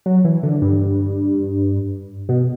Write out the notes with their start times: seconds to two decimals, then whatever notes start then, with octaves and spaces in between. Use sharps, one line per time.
0.06 F#3
0.25 E3
0.43 D3
0.62 G2
2.29 B2